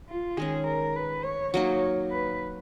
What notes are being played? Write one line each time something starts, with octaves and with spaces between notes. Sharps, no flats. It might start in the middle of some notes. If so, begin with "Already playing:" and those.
F4
D#3 G#3 C#4 G#4
A#4
B4
C#5
F#3 A#3 D#4 C#5
B4